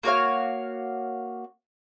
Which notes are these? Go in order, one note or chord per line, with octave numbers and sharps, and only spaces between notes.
A#3 F#4 C#5 F5